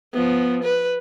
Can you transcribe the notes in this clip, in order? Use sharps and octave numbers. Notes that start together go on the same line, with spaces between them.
F3 B3
B4